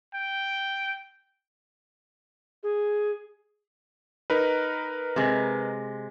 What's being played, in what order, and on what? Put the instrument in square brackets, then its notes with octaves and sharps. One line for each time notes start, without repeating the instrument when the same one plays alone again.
[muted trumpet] G5
[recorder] G#4
[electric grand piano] D#4 A#4 B4
[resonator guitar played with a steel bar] C3 G#3